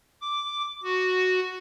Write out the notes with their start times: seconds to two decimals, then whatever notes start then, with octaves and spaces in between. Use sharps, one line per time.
0.21 D6
0.83 F#4